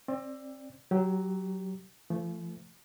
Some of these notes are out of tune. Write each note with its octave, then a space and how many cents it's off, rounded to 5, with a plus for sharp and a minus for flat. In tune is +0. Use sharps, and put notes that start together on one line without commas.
C4 +30 D5 +0
F#3 +15 G4 -10
F3 -40 A3 +0